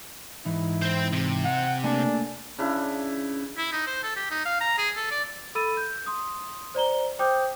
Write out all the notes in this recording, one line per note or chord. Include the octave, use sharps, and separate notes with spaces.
G#2 E3 D#4 E4
C4 C5
C3
F#5
A3 A#3 D4 G#5
C#3 D4 E4
E4
D#4
C5
A4
G4
D#4
F5
A#5
G#4
A4
D5
A4 B5 E6 A6 D#7
G6
C6 D#6
C5 D5 A#5 G7
C5 G5 D6 D#6 G6